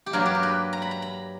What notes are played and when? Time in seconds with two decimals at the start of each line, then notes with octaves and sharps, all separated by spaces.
0.06 G4
0.13 G2 F#3 A#3 A#4
0.26 G4
0.35 A#4
0.43 B4
0.73 A#5
0.82 B5
0.91 A#5
1.02 B5